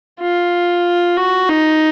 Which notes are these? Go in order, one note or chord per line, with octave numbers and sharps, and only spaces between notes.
F4
F#4
D#4